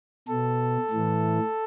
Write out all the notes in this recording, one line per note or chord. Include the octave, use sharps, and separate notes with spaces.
B2 A4
A2 E3